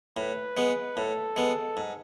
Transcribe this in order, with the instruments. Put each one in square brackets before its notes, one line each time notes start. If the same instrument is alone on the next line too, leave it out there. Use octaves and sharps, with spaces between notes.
[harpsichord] A2 [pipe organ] B4
[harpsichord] G#3 B3
[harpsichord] A2 [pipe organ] A4
[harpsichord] G#3 B3
G#2